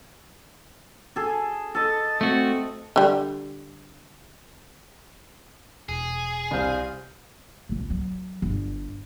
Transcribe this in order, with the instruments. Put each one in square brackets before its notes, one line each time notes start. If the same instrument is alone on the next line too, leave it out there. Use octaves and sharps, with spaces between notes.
[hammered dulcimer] G#4 A4
[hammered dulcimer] A4 D#5 [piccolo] A6
[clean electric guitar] A3 F#4 [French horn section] C4
[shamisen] D3 G3
[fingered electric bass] E1 [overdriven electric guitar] G#4
[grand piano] C2 [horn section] C5 F5
[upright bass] G#1 C#2
F#3
G1